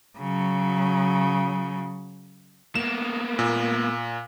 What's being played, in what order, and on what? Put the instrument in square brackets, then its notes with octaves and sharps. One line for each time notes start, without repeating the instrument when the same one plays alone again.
[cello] C#3 F#3
[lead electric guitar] A#3 B3 [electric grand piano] E7
[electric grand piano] A#2